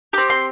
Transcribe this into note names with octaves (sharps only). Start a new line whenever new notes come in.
C4 G4 D6
C6